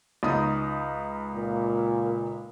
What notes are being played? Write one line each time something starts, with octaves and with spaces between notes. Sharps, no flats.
C#2 D#4 D#6
A#2